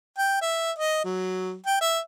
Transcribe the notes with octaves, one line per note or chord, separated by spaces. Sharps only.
G5
E5
D#5
F#3
G5
E5